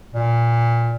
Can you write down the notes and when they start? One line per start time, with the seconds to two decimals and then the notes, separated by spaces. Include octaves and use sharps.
0.14 A#2